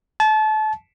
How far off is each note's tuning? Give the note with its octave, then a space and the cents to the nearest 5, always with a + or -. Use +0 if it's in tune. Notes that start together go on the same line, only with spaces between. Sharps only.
A5 -30